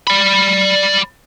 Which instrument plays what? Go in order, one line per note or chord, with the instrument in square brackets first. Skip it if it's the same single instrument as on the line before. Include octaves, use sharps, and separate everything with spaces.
[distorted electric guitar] D5 B5